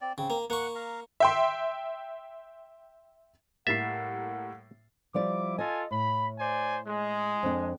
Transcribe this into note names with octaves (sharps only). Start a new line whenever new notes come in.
C4 D5
C#3 C4
A#3
A#3 F#5 C#6
F5 A#5
E5 G5 C6
A2 G3 A#3 A4 E5 F#5 A6 C7
F3 G3 E4 D5 D6
F4 A4 D#5 G#5
A2 B5
C5 D5 G#5
G#3
F2 D4